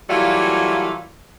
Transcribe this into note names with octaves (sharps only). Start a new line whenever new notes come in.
E3 F#3 G3 A3 A#3 F4